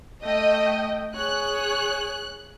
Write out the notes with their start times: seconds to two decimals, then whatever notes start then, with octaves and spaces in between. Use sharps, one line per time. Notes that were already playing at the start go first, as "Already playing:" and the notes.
0.23 A3 D#5 G5
1.15 G#4 C#5 F#6